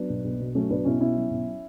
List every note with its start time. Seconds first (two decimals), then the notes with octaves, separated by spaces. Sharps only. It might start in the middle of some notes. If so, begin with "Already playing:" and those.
Already playing: F#3 B3 D4
0.10 B1
0.24 B1
0.39 B2
0.55 F#3 A3 C#4
0.70 B1 B3 D4
0.85 B1 C#4 E4
1.00 B2 C#4 E4
1.16 F#3
1.31 B1